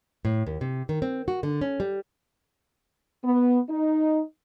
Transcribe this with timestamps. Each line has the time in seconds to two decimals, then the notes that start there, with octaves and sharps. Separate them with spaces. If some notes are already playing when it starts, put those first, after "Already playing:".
0.25 A2
0.47 D#2
0.61 C3
0.89 D#3
1.02 C4
1.28 F#4
1.43 D3
1.61 C#4
1.80 G3
3.23 B3
3.69 D#4